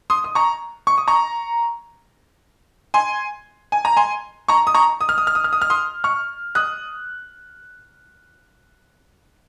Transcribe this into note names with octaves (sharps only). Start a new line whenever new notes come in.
C6 D#6
D#6
A#5 C#6
C#6
D#6
A#5 C#6
G#5 C6
G#5
A#5
G#5 C6
A#5 C#6
D#6
A#5 C#6
D#6
F6
D#6
F6
D#6
F6
D#6
F6
C6 D#6
C#6 F6
D#6 F#6